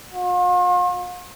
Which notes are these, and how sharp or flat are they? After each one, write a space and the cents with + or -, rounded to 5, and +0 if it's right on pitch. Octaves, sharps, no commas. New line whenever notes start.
F4 +45